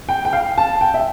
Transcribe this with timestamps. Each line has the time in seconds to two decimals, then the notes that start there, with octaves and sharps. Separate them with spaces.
0.09 G5
0.25 G5
0.33 F5
0.58 A5
0.81 G5
0.94 E5